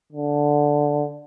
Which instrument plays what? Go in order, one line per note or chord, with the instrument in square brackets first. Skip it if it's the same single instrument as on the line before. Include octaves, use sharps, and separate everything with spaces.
[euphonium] D3